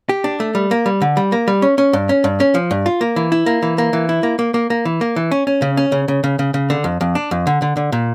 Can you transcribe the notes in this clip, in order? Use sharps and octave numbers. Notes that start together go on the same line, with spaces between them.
G4
D4
A3
G3
A#3
G3
D3
G3
A#3
G3
C#4
C#4
G2
C#4
G2
C#4
F3
G2
F4
A#3
E3
E4
A#3
E3
A#3
E3
E4
A#3
A#3
A#3
A#3
E3
A#3
E3
C#4
C#4
C#3
C#4
C#3
C#3
C#3
C#3
C#3
D3
F2
F2
D4
F2
D3
D3
D3
A#2